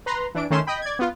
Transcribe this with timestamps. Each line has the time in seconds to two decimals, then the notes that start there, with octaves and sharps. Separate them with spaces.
0.06 B4 A#5 C6
0.35 E3 D4 D7
0.50 D#3 A3 C#4 C6 E7
0.67 D#5 G5 B5
0.82 D5 G#6
0.99 B3 F4